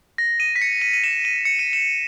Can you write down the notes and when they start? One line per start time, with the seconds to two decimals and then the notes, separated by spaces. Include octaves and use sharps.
0.18 A#6
0.40 D#7
0.56 B6
0.61 C#7
0.82 D#7
0.93 D#7
1.04 E7
1.25 D#7
1.45 C#7
1.59 D#7
1.73 E7